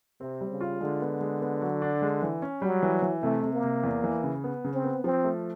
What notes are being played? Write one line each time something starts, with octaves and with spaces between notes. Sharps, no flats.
C3 C4
G3
C#3
F4
D3 G#3
B3
G#3
B3
F#3
D4
G#3
E3
C#4
F#3 G3
E3
E3
C3 A3
C3
A#3
C3
E2
E3
C#3
B3
C#3
C4
B3
F3 C4
A3